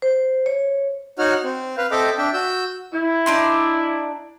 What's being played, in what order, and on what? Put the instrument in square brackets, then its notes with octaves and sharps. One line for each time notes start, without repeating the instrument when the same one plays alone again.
[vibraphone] C5
C#5
[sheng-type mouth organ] D#4 F#4 C#5 F#5 F6
C4
B4 F5
C4 A4 D#5 E5 G5 D6
D4 E5 G5
F#4 E6 G6
[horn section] E4
[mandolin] D4 D#4 C6